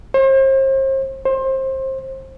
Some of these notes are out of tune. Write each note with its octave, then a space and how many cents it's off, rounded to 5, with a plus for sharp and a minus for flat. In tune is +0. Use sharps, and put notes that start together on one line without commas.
C5 +40
C5 +25